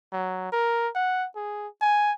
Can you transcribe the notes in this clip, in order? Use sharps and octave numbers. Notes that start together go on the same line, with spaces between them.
F#3
A#4
F#5
G#4
G#5